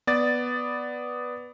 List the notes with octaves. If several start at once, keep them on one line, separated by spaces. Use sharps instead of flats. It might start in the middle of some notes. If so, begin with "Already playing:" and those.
B3 D5 A6